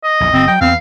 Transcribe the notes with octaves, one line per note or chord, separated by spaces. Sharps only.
D#5
A#1 E2
F#1 C4
F#3 G5
E2 B3 C4 F5